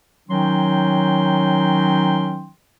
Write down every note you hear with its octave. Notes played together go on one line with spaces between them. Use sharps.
D#3 F#3 C#4 D#4 G5 C6